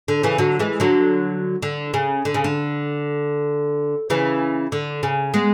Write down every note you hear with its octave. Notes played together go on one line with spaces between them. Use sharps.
D3
C#3 E3
D3 F#3
E3 G#3
D3 F#3
D3
C#3
D3
C#3
D3
C#3 E3
D3
C#3
G#3 B3